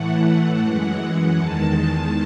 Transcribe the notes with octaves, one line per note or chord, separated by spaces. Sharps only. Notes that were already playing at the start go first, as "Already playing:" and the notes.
Already playing: A2 E3 A3 F#5
F#2 E3 G#3
E2 D#3 G#3 A5